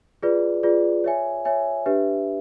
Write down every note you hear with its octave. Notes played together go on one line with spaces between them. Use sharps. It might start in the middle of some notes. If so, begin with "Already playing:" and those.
F4 G#4 B4 D5
F4 G#4 B4 D5
C#5 E5 G#5
C#5 E5 G#5
D4 G4 B4 E5